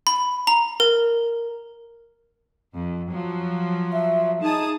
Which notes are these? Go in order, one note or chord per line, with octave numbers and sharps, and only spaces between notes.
B5
A#5
A#4
F2
F3 F#3
E5
D#4 G#4 A5 D#6